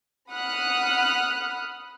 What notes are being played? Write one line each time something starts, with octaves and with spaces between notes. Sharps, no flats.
F#5 B5 D#6 F6 F#6